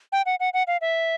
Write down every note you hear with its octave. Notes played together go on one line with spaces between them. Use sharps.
G5
F#5
F#5
F#5
F5
E5